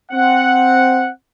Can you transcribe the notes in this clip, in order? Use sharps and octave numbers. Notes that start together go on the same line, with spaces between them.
C4 F#5